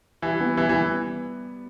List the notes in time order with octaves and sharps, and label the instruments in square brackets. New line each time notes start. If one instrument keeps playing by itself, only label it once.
[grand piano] E3 [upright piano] G3
[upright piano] B3
[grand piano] E3 [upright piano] G3
[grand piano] E3
[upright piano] B3